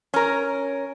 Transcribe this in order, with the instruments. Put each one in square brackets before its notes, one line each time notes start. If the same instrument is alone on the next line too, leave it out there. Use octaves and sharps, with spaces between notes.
[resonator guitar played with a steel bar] C#4 A#4